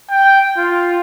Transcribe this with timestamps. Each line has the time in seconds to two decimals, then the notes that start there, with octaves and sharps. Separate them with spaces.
0.10 G5
0.58 F4